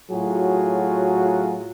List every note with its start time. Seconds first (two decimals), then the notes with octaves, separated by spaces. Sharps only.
0.11 A2 F#3 F4 F#4 G#4